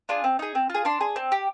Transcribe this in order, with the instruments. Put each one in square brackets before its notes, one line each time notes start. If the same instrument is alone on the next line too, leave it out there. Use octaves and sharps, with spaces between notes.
[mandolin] D4 F4 G#4
C4
D#4 G#4
C4
F4 G#4
D4 C6
G#4
C4
G4